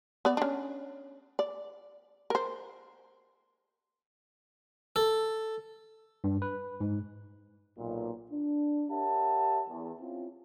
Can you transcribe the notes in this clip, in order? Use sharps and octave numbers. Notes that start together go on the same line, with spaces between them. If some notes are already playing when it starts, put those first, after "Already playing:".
B3 D5
C#4 D4
D5
A#4 C5
A4
G2
B4
G#2
B1 A#2
D4
G4 A#4 C#5 E5 F#5 A5
E2
C4 C#4 E4 F4